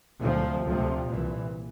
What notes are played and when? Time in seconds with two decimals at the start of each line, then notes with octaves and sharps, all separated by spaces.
0.23 D2 C3 F3
0.66 D2 C3 F3
1.09 C2 A#2 E3